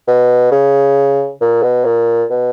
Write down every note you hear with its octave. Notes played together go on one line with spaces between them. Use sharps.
B2
C#3
A#2
B2
A#2
B2